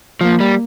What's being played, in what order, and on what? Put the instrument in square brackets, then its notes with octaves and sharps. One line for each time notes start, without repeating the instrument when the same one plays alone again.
[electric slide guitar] F3 [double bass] A#3
[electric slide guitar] G3